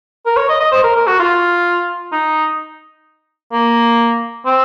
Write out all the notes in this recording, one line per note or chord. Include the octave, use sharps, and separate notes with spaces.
A#4
C#5
D#5
D#5
C5
A#4
A#4
F#4
F4
D#4
A#3
C4